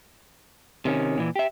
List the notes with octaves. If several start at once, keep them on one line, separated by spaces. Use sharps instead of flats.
C3 D#3 C#4
A#2 E3
G4 E5